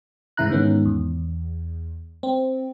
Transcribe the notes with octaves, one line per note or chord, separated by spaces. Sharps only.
G#2 C#3 E3 E4 A#5 F#6
G#2 D#3 B3 C#4
E2
C4